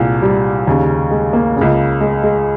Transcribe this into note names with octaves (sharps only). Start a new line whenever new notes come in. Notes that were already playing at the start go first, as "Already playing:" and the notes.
Already playing: C2 A#2 G#3
G3
D#2 C#3
G#3
A#3
C#2 C#3
G#3
G#3